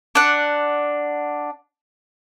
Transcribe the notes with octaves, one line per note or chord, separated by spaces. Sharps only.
D4 F#5